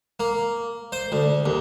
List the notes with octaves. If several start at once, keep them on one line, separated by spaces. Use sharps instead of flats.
A#3
C5
D2
D#2